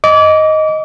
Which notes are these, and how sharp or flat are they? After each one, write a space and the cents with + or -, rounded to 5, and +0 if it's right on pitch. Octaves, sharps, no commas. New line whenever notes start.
D#5 +5 D6 -30